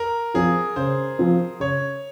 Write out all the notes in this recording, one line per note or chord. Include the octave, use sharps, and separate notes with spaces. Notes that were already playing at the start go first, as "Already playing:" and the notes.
Already playing: A#4
F3 C4 F4 G#4
C#3 C5
F3 C4 F4
C#3 C#5